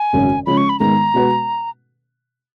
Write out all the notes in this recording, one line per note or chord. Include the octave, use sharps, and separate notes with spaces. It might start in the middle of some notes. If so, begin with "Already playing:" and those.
Already playing: G#5
G#1 F#2 C#3 F#3 C#4
C#3 F3 G#3 C#4 B5
C#6
B5
G#2 D#3 G#3 B3 A#5
B2 G#3 B3 F#4 B4